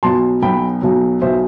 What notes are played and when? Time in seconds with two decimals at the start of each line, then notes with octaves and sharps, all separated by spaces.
0.03 B1 B2 F#3 A5 C6
0.42 B1 B2 F#3 G5 B5
0.82 B1 B2 F#3
1.22 B1 B2 F#3 C5 E5